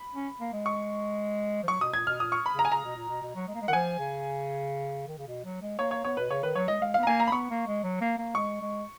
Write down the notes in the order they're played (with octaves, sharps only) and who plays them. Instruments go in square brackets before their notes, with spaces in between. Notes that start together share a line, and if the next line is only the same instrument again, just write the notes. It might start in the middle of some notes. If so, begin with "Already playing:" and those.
Already playing: [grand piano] B5
[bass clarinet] C#4
A#3
G#3
[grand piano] C#6
[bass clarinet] F3
[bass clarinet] F#3 [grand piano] C#6
[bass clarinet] B2 [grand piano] D#6
[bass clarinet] A#2 [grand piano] G#6
[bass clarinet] B2 [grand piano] F6
[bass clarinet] A#2 [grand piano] D#6
[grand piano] C#6
B5
[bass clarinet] C#3
[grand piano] A#5
G#5
[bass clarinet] C#3 [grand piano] A#5
[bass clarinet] B2
A#2
B2
B2
F#3
G#3
A#3
G#3
[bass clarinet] D#3 [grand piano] F#5
[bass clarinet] F3 [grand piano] G#5
[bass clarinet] C#3
D#3
C#3
B2
F#3
G#3
[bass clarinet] A#3 [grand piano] C#5
[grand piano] C#5
[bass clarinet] B3 [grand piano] C#5
[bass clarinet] B2 [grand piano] B4
[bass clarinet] C#3 [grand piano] C#5
[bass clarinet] D#3 [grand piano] B4
[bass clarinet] F#3 [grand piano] C#5
[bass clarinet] G#3 [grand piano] D#5
[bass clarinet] G#3 [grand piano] F5
[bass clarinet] B3 [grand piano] F5
[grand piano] A#5
[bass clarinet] A#3 [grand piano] G#5
[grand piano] A#5
B5
[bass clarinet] B3 [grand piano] C#6
[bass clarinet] A#3
G#3
F#3
A#3
A#3
[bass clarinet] G#3 [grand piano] C#6
[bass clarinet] G#3